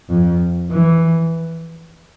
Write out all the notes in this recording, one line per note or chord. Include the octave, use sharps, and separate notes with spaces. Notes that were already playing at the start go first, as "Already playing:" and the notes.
F2
E3